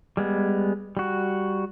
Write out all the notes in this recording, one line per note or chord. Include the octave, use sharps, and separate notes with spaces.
G3 G#3 B3
G3 F#4